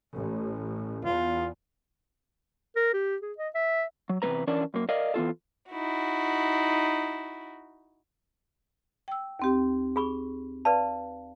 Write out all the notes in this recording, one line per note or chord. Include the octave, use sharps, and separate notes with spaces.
A1
E2 F4
A#4
G4
G#4
D#5
E5
F#3
E2 C3 D#3 A#3 B4 A#5
E3 C#4 D4 A#4 D5 A5
F#2 A#3
A#4 D5 D#5 F5
E3 B3 F4 A4
D#4 E4 F#4
G5 E6
D#2 C4 G4
G#4 B5 C#6
B4 D5 F5 A5